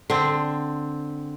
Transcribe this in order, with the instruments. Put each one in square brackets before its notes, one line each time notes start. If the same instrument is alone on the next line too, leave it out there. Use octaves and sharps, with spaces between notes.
[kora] D3 C4